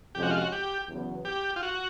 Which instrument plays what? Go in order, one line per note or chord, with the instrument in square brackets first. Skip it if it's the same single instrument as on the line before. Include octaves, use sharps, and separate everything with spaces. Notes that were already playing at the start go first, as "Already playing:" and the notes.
[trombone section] F2 C3 F3 G#3 C#4 [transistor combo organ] G4
[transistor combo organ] F#4
F4
F#4
G4
[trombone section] E2 C#3 F#3 B3
[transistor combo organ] G4
F4
F#4